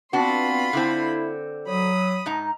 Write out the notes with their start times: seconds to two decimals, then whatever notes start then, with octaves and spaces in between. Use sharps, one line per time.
0.13 B3 C4 D4 F4 F#4 B5 C6
0.73 D3 C4 E4
1.67 F#3 B5 D#6
2.26 G#2 D#4 A#5